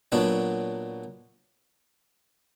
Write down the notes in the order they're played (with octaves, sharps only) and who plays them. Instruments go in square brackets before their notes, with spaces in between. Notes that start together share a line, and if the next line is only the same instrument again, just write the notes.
[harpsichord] A#2 F#3 B3 D4